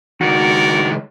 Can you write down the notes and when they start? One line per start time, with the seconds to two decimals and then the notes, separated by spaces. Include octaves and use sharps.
0.21 C#2 D#3 F#4 A#4 C#5 D5